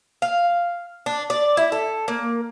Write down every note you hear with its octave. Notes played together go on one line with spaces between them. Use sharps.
F5
D4
D5
E4
A4
A#3